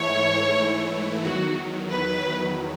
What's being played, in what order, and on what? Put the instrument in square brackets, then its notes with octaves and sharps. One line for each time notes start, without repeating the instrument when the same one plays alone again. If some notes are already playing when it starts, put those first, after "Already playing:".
Already playing: [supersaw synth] G#2 E3 A3 E4 [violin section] C#5
[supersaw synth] E2 D#3 F#3 [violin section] F#4
[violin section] B4